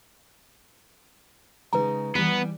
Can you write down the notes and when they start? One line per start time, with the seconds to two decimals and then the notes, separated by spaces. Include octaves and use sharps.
1.73 C#3 G#3 D#4 B4 A#5
2.15 E3 G3 B3